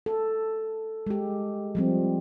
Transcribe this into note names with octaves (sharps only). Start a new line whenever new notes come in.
A4
G#3 G4
F3 G3 C4